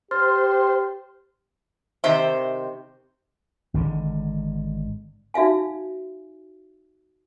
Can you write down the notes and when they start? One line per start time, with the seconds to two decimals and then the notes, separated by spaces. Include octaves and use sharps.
0.11 G4 C5 C6 F6 A6
2.04 C3 D#3 C5 E5
3.74 G#1 D3 G#3
5.34 D#4 F#4 E5 F5 G#5